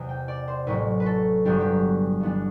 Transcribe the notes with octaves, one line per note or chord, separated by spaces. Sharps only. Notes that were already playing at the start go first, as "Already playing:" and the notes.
Already playing: E2 C3 E3
G5
D5
C5
A1 A2 F#3 B4
B4
A4
G1 G2 F#3 B3 D4 G4
G4
G2 E3 B3 D4